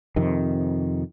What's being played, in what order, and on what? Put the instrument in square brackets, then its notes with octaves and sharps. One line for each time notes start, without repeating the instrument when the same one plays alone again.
[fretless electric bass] F2 C3 D#3